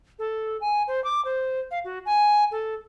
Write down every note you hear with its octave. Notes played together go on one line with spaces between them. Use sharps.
A4
G#5
C5
D6
C5
F5
F#4
G#5
A4